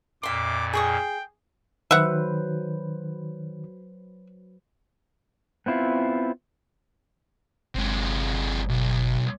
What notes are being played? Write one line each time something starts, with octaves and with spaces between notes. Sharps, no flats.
F2 A#2 E5 C6 D6
G#4 G5 C#6 D#6
D#3 F#3 B4 C5 E5 F#5
B3 C4 E4 F4
G1 C3 G#3
B1